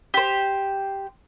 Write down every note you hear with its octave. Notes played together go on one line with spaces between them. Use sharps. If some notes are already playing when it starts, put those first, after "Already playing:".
G4 C5